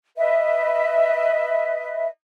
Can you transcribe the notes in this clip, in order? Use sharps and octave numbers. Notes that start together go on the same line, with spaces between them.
B4 D#5 E5